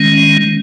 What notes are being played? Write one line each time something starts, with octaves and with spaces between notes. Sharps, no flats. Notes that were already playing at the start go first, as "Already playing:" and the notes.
Already playing: D#3 G#3 C#4